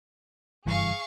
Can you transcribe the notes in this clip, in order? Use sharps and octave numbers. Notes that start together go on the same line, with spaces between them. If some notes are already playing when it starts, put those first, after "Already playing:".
F#1 G2 E3 G#4 F5 C#6